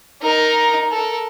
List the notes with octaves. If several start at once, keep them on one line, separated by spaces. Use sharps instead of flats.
D#4 A#4
A4 A#4